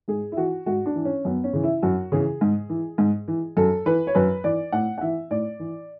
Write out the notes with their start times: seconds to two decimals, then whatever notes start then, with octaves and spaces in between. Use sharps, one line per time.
0.08 G#2 G#4
0.32 E4
0.37 E3 F#4
0.66 G#2 F#4
0.86 D4
0.95 E3
1.05 C#4
1.25 F#2 B3
1.44 C#4
1.53 C#3 E3
1.63 E4
1.83 F#2 F#4
2.12 C#3 E3 G#4
2.41 G#2
2.69 E3
2.98 G#2
3.28 E3
3.57 F#2 A4
3.86 E3 B4
4.07 C#5
4.15 F#2 B4
4.44 E3 D5
4.72 A2 F#5
4.98 F#5
5.01 E3 E5
5.30 A2 D5
5.59 E3